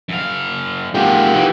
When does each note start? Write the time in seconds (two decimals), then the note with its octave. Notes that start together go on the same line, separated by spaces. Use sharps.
0.09 F#2 F5
0.95 G#3 A#3 F4 G4
1.35 E3